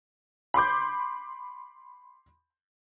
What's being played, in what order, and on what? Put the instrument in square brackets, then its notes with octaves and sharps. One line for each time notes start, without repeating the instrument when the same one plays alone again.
[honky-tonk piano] B5 C6 D6 G6